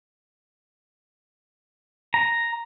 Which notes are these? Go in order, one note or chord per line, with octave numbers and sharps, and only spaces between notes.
A#5